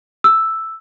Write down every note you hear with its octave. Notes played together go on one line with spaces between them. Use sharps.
E6